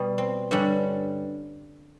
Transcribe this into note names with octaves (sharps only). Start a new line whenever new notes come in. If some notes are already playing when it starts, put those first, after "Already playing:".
Already playing: B2 G3
C4
G2 D3 G3 C#4